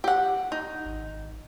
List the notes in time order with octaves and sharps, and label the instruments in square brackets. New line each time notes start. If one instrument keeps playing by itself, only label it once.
[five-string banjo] G4 F#5
D#4
[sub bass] G#1